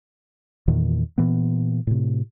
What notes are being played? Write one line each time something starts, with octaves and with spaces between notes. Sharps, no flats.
E2 A#2 D#3 E3
A#2 E3 B3
A2 C3